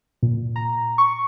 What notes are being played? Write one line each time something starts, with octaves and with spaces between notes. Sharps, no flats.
A#2
A#5
C#6